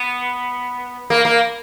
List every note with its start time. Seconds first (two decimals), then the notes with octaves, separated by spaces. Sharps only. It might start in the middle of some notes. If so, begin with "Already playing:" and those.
Already playing: B3
1.10 A#3
1.25 A#3